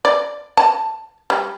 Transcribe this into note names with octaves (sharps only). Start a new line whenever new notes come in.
D5
A5
G3